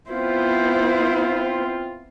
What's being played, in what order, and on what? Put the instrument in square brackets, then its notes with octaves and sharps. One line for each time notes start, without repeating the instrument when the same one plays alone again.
[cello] B3 E4 [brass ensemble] C4 F4 [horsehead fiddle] C5